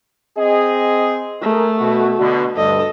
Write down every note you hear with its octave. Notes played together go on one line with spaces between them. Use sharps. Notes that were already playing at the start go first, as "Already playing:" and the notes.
C4 G#4 D#5
A3 G#4 A#4
B2 F#4
B2 D3 F#4
D2 G2 A4 D#5